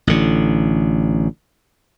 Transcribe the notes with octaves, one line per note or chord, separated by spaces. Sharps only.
A1 D3